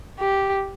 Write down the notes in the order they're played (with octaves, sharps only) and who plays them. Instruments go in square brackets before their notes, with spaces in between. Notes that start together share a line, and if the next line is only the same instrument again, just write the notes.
[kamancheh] G4